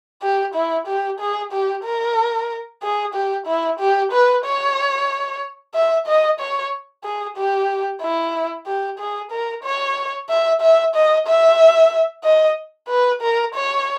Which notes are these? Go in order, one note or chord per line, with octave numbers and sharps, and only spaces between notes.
G4
E4
G4
G#4
G4
A#4
G#4
G4
E4
G4
B4
C#5
E5
D#5
C#5
G#4
G4
E4
G4
G#4
A#4
C#5
E5
E5
D#5
E5
D#5
B4
A#4
C#5